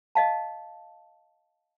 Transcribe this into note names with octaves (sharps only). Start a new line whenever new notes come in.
D#5 F5 A5